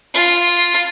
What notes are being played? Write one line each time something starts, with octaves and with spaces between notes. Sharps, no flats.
F4